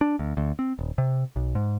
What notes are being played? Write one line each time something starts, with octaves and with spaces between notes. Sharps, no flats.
D4
D2
D2
C4
D#1
C3
B1
G#2